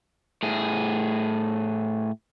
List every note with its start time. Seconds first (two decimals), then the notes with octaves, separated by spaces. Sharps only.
0.43 A2 G#4